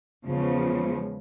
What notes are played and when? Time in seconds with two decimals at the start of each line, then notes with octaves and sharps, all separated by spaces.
0.25 E2 C#3 F3 G#3